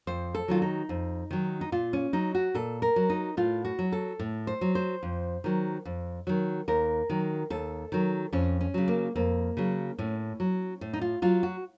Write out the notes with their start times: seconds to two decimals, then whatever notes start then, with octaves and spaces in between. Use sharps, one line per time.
0.07 F2 C5
0.35 A4
0.48 D#3 F#3 F4
0.62 D#4
0.89 F2
1.31 D#3 F#3
1.61 D#4
1.72 A#2 F4
1.93 C#4
2.13 F#3 D#4
2.35 F#4
2.54 A#2 A4
2.82 A#4
2.96 F#3
3.10 D#4
3.37 A2 F4
3.65 F#4
3.79 F#3
3.92 A4
4.19 A2
4.47 C5
4.61 F#3
4.75 C5
5.03 F2
5.44 D#3 F#3
5.85 F2
6.27 D#3 F#3
6.68 D#2 A#4
7.10 D#3 F#3
7.50 D#2 A4
7.92 D#3 F#3
8.33 F2 C#4
8.61 C#4
8.74 C#3 F#3
8.88 A#3
9.16 F2 A#3
9.57 C#3 F#3
9.98 A2 C#4
10.40 F#3
10.81 A2
10.93 D#4
11.02 F4
11.22 F#3 F4
11.43 F#4